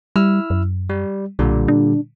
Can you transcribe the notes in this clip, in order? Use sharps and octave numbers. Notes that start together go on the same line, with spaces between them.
G3 E4 E6 F6
F#2
G3
B1 A#2 D3 G3
D4